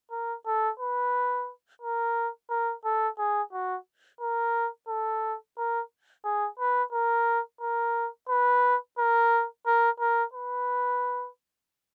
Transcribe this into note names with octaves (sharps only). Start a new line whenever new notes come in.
A#4
A4
B4
A#4
A#4
A4
G#4
F#4
A#4
A4
A#4
G#4
B4
A#4
A#4
B4
A#4
A#4
A#4
B4